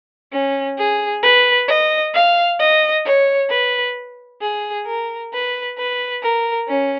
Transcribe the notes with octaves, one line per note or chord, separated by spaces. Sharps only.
C#4
G#4
B4
D#5
F5
D#5
C#5
B4
G#4
A#4
B4
B4
A#4
C#4